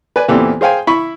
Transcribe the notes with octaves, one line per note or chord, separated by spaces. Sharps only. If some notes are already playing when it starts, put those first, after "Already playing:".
B4 D5 G#5
E2 A#2 E3 C4 G4 A4
G#4 C5 F5 G5 G#5
E4 B5 C#6